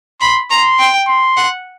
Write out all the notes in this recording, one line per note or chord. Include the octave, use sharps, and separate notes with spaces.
B5 C6
A#5 C6
G5
C6
F#5